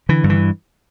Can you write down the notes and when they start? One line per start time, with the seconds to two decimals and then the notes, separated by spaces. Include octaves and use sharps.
0.09 D3 E3
0.24 G2
0.30 E3